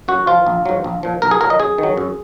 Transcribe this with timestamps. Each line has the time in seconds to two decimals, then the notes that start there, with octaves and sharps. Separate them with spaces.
0.08 F#2 F#4
0.27 F3 F4
0.46 A#1
0.65 G#2 F#3
0.84 A#1
1.03 A#2 F3
1.22 B1 A#4
1.31 G#4
1.41 A#2 F#3 A#4
1.50 D#5
1.60 F#2 G#4
1.78 D#3 F#3
1.97 F#2